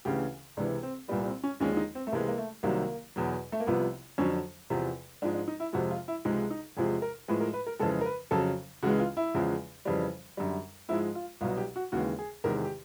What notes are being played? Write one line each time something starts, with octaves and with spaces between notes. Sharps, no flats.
D2 C#3 E3 G4
C#2 C3 E3 D4
C4
C2 A#2 G3 B3
C4
C#4
D#2 D3 F3 G#3 C#4
D#4
C4
A3
C#2 C3 E3 G#3 A#3
A#3
A3
C2 C3 D#3 F#3 A#3
E2 B2 F#3
A3
A#3
C2 C3 F3 B3
F2 D3 F#3 C#4
E2 C3 F3
G#2 F3 G#3 D4
D4
D#4
E4
F2 C3 F3 G#3 F#4
F4
E4
C#2 C3 F3 G#3 D#4
D#4
E2 C3 F3 G#3 G#4
A#4
A2 F3 G#3 B4
A#4
B4
A#4
F2 C#3 E3 G#3 A4
A#4
B4
F2 C#3 F#3 A4
C#2 C#3 E3 G#3 F#4
F4
E4
E2 C#3 F3 G#3
F2 C#3 E3 G3
F#2 D3 G3
G#2 F3 G#3 E4
F4
C2 B2 F#3 F4
G4
F#4
D#2 C#3 E3 G#3 F#4
G#4
E2 C3 D#3 G#3 A#4
G4